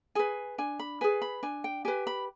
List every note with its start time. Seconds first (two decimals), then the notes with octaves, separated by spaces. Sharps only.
0.15 G#4 B4 G#5
0.58 D4 G#5
0.79 B5
1.01 G#4 B4 G#5
1.22 B5
1.43 D4 G#5
1.64 G5
1.85 G4 B4 G#5
2.07 B5